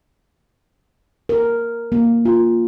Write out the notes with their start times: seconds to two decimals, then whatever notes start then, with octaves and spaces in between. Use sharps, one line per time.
1.29 A#4
1.92 A#3
2.25 F4